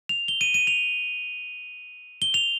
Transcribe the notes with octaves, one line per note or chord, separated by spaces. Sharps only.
F7
G7
D#7
D#7
F7
G7
F7